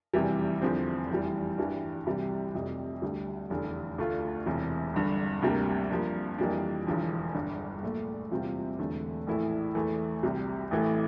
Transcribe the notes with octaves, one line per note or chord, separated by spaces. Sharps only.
F1 E2 C3 E3 G3
E2 D3 F3 C4
F1 E2 E3 G3
G2 E3 G3 D4
C2 C3 E3 G3
F1 F2 C3
D2 D3 G3
F1 E2 D3
D2 D3 A3 D4 F4
E1 E2 C3
G1 G2 D3
D2 C3 G3 A#3 D4
G2 F3 A#3
F2 E3 G3 A#3 D4
E1 E2 D3 F3
G1 G2 D3
A#1 A#2 A3
E2 C3 G3 C4 F4
E1 E2 D3 A3
A#1 A2 E3 A3 E4
E2 E3 A3
C2 C3 G3
A1 A2 E3 A3